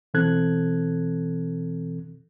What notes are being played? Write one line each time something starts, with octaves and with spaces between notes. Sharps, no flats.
B2 E3 C4 A4 F#6 G#6